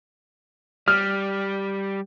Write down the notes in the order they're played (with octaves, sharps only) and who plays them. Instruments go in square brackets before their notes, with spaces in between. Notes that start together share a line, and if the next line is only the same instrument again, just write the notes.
[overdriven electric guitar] G3 [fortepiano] F6